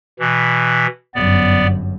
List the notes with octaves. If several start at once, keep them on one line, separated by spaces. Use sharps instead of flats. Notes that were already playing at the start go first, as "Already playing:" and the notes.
B2 E3
G1 F#2 B3 D5